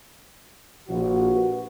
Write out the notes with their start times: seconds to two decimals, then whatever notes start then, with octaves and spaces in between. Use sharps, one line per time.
0.89 A#1 F#4
1.35 G4 B4